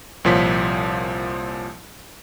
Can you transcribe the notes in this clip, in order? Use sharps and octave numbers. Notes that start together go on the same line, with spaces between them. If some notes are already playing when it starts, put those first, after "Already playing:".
C2 A#2 F3 C#5 B6